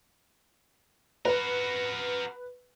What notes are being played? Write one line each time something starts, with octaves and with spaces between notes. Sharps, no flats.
F#4 A#4 B4